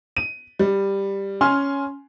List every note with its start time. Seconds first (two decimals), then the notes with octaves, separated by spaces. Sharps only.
0.17 D#7
0.59 G3
1.41 C#4 G#5 C6 F6